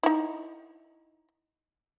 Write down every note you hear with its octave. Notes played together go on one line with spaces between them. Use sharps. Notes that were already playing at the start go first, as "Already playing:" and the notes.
D#4 E4